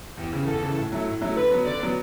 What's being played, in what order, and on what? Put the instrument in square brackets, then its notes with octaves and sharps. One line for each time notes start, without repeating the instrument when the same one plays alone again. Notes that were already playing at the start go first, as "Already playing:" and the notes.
[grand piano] E2 [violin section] G4
[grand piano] C#3 E3
[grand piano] E2 [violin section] A4
[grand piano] C#3 E3
A2
F#3 A3 E4
A2
F#3 A3 E4
[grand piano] D3 [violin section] B4
[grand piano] F#3 B3
[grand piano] D3 [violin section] D5
[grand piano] F#3 B3